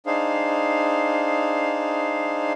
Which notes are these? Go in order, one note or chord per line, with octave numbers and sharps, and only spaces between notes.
D4 D#4 G#4 C5 F5